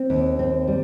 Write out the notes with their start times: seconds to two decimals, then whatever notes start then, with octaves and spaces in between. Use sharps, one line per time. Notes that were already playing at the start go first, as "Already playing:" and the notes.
Already playing: C4
0.10 D#2
0.39 C4
0.68 G3